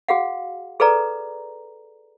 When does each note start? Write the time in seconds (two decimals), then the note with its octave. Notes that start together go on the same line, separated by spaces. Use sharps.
0.08 F#4 G#4 F5 F#5
0.80 G#4 A4 B4 D5 A#5